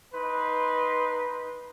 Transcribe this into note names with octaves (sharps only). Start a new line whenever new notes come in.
D#4 B4 C6